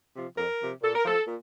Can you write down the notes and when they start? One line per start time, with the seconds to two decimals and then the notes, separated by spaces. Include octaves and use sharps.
0.15 C3 F3
0.37 F2 A#4
0.61 C3 F3
0.82 A#2 A4
0.95 A#4
1.05 F3 A4
1.27 A#2